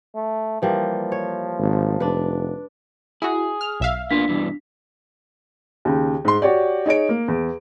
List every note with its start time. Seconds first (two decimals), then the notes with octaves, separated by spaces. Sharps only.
0.15 A3
0.62 E3 F3 G3 A#3
1.12 C#5
1.59 G#1
2.00 F1 D4 B4
3.22 E4 F#4 G#4
3.61 F6
3.80 B1 E5 F5
4.11 A#3 B3 D4 F4 B6
4.29 G2 B2 E3
5.85 D#2 C#3
6.25 G#2 C6
6.42 F#4 G4 C#5 D5
6.86 D#4 G#4 C#5 D7
7.09 A#3
7.28 E2